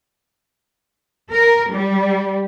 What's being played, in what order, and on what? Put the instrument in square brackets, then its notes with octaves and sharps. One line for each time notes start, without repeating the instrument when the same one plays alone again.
[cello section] A#4
G3